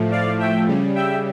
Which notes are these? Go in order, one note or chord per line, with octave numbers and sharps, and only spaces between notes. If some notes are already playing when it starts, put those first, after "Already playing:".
Already playing: A2 F3 A3
D5 F5
E5 G5
C#3 G3
E5 G5